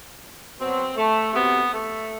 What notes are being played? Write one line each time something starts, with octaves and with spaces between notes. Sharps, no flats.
B2 F#3 C4
A3
C3 F#3 B3
A3